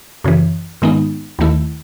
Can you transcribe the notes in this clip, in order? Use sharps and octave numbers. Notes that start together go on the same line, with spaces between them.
F#2 C#3 E3
G#2 D#3 G#3 B3 D#4
D#2 D#3 A3 E4